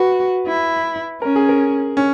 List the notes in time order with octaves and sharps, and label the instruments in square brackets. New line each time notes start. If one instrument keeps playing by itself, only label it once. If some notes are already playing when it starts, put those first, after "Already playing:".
Already playing: [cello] F#4 [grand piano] B4
[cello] E4
[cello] C#4 [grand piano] A#4
[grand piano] G#4
A#4
C#4